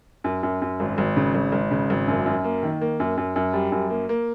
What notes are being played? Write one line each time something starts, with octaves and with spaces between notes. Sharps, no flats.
F#2
F#2
F#2
G#1
G#1
C#3
G#1
G#1
C#3
G#1
F#2
F#2
A#3
D#3
A#3
F#2
F#2
F#2
G3
F#2
A#3
A#3